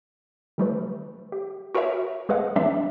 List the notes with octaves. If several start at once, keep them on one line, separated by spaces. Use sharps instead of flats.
D#3 G3 A3 B4
G4
F#4 A#4 B4 C#5 E5
G#3 G#4 B4 D#5 F5 F#5
E3 G3 G#3 C4 D4 E5